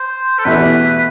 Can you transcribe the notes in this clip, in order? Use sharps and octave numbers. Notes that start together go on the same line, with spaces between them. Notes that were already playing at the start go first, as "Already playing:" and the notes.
Already playing: C5
A4
E2 B2 A3 E4 G4 B4